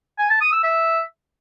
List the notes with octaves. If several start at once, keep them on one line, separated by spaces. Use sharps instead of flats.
G#5
A5
D#6
E6
E5